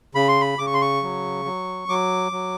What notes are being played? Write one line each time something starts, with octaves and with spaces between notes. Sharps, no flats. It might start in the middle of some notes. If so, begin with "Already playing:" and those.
C#3 B5
C6
B5
C#3 D6
C#6
C6
C#6
F#3
F#3
F#3 D6
F#3